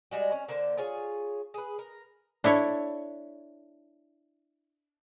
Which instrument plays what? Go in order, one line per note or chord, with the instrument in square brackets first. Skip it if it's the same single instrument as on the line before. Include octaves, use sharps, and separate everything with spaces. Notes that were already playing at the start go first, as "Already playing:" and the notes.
[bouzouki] G3 G#3 F#4
C#4
D3 A#3 C5
F4 G#4 C#5
G#4 B4
A#4
[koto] D4 E4 A4 C#5